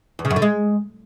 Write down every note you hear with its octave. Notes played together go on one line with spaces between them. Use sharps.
E2
C#3
F#2
D3
G#3